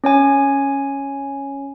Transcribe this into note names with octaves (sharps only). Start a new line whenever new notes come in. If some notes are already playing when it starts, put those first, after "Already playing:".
C#4 C#5 G#5